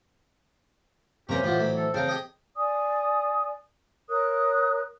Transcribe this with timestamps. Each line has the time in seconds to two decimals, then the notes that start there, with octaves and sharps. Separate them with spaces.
1.29 C3 E3 A#3 C#4 G4 C5 A#5 C#6
1.44 A2 E3 F4 F#4
1.58 A1 F#3 B5
1.77 A4
1.94 C#3 C4 A4 F5 G5 A#5
2.08 G4 G#4 D#5
2.57 D5 G#5 D#6
4.10 A#4 C#5 D#6 F#6